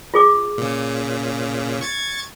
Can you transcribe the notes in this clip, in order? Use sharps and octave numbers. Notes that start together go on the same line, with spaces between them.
F4 G#4 D6
A#2 C#3
C#6 G#6 A6